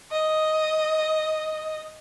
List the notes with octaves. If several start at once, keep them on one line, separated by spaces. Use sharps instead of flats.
D#5